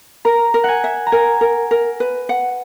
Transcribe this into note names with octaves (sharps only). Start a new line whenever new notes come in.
A#4 A#5
A#4
F#5 G#5
E5
A#5
A#4 G#5
A#4
A#4
B4
F#5